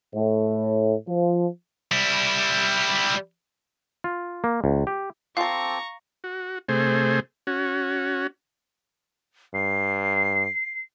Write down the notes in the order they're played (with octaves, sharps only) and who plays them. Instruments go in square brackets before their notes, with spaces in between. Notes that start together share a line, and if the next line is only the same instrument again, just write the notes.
[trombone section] A2
F3
[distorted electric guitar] G3 E4
[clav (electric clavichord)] F4
A#3
C#2
G4
[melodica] C4 A4 D6 [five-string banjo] F4 A5 [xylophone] F5 [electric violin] A#5 C#6
[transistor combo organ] F#4
C3 A3 G#4 C5
C#4 F#4
[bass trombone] G2 [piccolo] C7